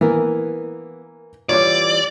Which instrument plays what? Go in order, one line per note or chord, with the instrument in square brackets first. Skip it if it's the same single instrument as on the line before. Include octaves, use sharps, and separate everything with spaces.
[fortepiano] E3 A#3 [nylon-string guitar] B3 A#4
[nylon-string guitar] E3 G3 F4 [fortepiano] C#5 D6 [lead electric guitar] D5